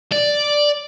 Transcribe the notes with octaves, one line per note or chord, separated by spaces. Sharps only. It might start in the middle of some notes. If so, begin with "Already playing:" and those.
D5